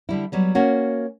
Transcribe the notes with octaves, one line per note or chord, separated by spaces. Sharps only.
D3 G3 E4
F#3 G3 B3
A#3 C#4 F#4